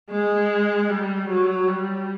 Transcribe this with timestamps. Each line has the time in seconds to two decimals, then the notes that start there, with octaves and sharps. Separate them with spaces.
0.11 G#3
0.90 G3
1.29 F#3
1.67 G3